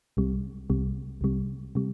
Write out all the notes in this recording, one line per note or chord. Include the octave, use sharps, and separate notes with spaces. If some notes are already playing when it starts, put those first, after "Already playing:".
C2 C3 G3
C2 C3 G3
C2 C3 G3
C3 G3